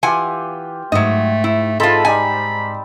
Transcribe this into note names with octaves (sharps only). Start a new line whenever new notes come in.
E3 F4 G4 F#5 G#5
G#2 F#3 A3 D#5
E4
G#3 C4 E4 F4 A4 B5
G3 D#4 G#5 A5